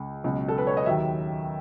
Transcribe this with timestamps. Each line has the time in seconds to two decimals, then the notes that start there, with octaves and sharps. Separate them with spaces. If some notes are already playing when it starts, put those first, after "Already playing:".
Already playing: C#2
0.24 C#2 B2 F#3
0.48 A4
0.58 B4
0.67 C#5
0.77 D#5
0.86 D#2 D#3 F#3 E5